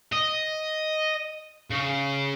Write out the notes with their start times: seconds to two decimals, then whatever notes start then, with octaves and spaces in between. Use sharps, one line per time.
0.12 D#5
1.71 C#3